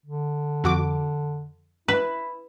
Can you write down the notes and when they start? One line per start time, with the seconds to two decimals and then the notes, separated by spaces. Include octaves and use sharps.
0.06 D3
0.64 F2 F#4 D6
1.88 E4 B4